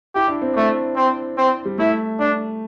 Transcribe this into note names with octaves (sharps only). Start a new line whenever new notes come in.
E4 G4
D4
C4
A3 D4
C4
C4
G3
A3 E4
D4